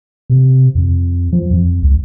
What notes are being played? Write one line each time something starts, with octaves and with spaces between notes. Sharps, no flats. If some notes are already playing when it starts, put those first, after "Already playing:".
C3
F2
F3
F2
C#2